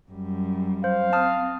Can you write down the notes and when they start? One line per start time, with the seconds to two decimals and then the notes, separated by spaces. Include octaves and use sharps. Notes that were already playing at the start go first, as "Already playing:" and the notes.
0.11 F#2 G3
0.84 C5 F5
1.13 C4 A5 D#6 F6